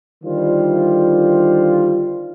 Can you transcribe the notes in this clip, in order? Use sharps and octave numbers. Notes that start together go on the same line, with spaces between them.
D3 D#3 G3 F4 C5